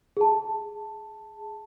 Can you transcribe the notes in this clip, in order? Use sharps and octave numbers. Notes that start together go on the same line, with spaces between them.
G#4 A5